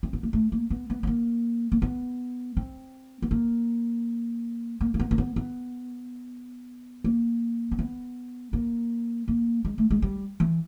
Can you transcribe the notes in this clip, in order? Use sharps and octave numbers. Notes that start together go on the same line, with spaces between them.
C4
B3
A#3
A3
A#3
B3
B3
B3
A#3
A#3
B3
C4
B3
A#3
A#3
A#3
B3
A#3
B3
B3
A#3
C4
B3
A#3
A#3
G#3
A3
G#3
G3
E3